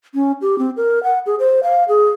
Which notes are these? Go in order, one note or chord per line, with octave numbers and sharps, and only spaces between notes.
C#4
G4
C4
A#4
F#5
G#4
C5
F5
G#4